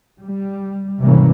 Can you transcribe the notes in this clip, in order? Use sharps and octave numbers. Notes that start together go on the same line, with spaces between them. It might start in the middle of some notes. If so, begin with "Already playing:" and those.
G3
G#1 C3 E3 G3 A#3 C#4